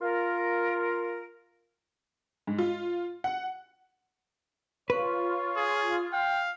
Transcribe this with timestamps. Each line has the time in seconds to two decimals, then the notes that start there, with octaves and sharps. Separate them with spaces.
0.01 F4 A#4
2.47 G#2
2.58 F4
3.24 F#5
4.90 F4 B4 C#5
5.57 G#4
6.13 F5 G5